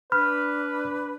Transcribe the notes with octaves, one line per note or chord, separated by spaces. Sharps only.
D4 B4 B5 F6